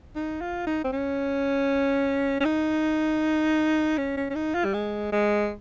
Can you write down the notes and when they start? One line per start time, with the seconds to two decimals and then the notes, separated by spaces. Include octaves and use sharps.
0.16 D#4
0.41 F4
0.67 D#4
0.84 C4
0.92 C#4
2.40 C#4
2.45 D#4
3.98 C#4
4.17 C#4
4.30 C#4
4.35 D#4
4.55 F4
4.65 G3
4.74 G#3
5.12 G#3